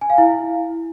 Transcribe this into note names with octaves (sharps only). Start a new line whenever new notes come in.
G#5
F5
E4